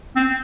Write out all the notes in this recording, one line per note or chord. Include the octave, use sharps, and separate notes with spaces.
C4